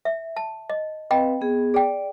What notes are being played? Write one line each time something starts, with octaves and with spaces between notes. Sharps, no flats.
E5
A5
D#5
C4 B4 D#5 F5 G5 B5
B3 G#4
G#4 D5 G5